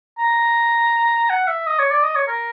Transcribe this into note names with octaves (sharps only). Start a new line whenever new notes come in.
A#5
F#5
E5
D#5
C#5
D5
D#5
C#5
A#4